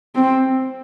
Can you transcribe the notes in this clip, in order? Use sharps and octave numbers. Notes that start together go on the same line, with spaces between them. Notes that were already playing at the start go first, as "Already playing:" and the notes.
C4